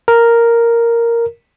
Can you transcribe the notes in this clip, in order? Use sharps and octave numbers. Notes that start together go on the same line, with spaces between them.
A#4